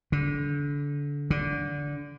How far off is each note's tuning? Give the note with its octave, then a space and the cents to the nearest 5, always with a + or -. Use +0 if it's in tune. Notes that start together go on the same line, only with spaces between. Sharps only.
D3 -25
D3 -15